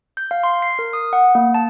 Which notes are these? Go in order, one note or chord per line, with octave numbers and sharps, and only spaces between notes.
G6
F5
C6
C7
A#4
D#6
F#5
A#3
A5